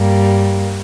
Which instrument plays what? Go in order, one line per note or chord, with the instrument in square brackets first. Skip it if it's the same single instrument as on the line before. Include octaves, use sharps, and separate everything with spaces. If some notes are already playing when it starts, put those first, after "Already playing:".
Already playing: [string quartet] G2 G3 A#3